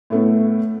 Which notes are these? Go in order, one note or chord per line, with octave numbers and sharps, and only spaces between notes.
A2 A3 B3